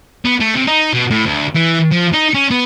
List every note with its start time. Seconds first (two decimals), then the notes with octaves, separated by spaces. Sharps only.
0.25 B3
0.40 A3
0.54 C3
0.67 D#4
0.93 B2
1.11 A2
1.26 D2
1.56 E3
1.92 F3
2.14 D#4
2.34 C#4
2.51 B3